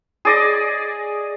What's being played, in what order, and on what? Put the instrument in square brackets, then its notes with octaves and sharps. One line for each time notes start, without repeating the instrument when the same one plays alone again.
[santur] G#4 D5 D#5